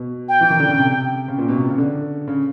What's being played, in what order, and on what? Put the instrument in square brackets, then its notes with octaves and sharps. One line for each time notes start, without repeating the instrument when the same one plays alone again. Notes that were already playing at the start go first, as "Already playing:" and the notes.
Already playing: [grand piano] B2
[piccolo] G5
[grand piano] E3
D#3
D3
C#3
C3
C#3
A#2
B2
C3
C#3
D3
C#3